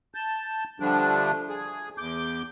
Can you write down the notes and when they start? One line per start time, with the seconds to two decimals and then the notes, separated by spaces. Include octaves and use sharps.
0.15 A5 G6
0.80 D3 F3 G3 A3 D4
1.49 G#4
1.98 E2 D6 G6